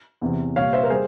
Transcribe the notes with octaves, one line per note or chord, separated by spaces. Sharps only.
E2 C3 E3
C2 A#2 G3 C#5 F5
C5 E5
A#4
G3 G#4 C5